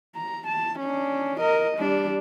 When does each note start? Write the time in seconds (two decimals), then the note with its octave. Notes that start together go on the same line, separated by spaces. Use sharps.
0.15 A#5
0.48 A5
0.80 C#4 D4
1.40 A#4 D#5
1.78 G3 D4